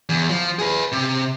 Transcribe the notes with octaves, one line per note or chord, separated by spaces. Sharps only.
E2
F3
G#4 B4
C3